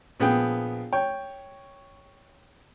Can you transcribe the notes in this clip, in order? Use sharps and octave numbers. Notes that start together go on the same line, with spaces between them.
A#1 B3 G#4 G5
C#5 G5